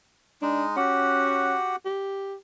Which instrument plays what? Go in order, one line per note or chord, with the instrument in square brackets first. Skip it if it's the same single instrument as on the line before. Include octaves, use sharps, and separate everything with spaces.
[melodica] G#3 D#4 [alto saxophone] D4
[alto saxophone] C#4 [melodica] F#4 G4 F#5
[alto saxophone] G4